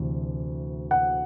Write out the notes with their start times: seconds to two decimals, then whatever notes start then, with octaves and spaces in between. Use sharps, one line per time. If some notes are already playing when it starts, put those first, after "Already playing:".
Already playing: D2 C3 E3
0.91 F#5